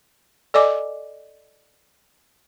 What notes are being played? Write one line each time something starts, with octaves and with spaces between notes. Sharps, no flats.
A4 D5 D#5 G#5 D6